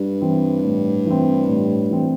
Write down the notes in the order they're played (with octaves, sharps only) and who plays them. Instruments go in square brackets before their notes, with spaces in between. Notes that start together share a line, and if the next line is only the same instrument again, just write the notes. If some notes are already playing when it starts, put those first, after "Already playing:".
Already playing: [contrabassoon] G2
[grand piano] E3 C4
A2
E3 C4
A2
E3 C4